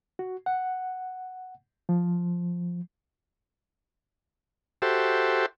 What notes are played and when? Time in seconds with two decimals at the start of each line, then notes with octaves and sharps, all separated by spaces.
0.19 F#4
0.46 F#5
1.89 F3
4.82 F#4 G4 A4 C5 E5